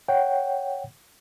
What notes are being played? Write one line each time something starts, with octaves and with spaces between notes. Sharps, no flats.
C#5 F#5 G5